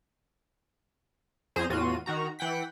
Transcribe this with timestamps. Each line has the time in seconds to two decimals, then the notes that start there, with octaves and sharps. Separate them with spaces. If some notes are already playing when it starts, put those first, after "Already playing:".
1.56 F2 G#4 C5 A#5 D#7
1.70 E2 A2 F4 F#4 D#7
2.06 D#3 F#4 A#5
2.39 E3 F#5 G5 B6